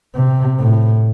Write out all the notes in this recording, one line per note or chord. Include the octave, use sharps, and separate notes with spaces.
C3
A2